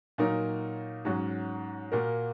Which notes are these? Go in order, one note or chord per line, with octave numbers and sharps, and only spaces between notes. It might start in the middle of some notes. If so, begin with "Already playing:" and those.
A#2 F#3 D#4 F#4 A#4
G#2 F#3 C#4 F#4
A#2 A#3 F#4 A#4